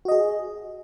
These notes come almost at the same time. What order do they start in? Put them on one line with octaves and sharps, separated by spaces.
F#4 D#5 G#4